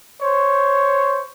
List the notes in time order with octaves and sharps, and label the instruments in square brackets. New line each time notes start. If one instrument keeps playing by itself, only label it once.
[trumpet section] C5 C#5